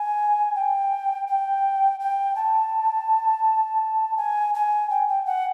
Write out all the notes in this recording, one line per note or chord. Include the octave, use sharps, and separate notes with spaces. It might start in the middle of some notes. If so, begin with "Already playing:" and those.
Already playing: G#5
G5
G5
G5
A5
G#5
G#5
G5
G5
F#5